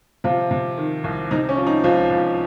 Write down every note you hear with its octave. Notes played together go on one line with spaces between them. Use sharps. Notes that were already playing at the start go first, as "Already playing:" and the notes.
C3 F3 F4
C3
D#3
C2
C3 D#4
C#4
F3
D#4
C#2 F3 F4
C#2